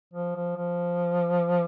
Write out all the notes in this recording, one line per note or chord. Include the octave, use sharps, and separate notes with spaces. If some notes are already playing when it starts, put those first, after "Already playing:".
F3
F3
F3